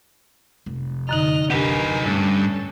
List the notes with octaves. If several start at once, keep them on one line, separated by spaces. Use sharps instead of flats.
F1
F#2 D3 D#4 D#5 F6
D2 D4 D#4 G4 A#4 B4 G#5
G2 A3 C#4 A4